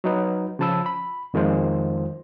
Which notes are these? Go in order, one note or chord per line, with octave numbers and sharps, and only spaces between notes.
F#3 D#4 B4
C#3 F3 A5 B5 E6
B5
F2 D#3 G#3 F4 C5